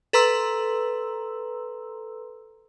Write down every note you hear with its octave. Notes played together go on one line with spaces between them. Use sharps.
A4 B4 A#5 C6 E6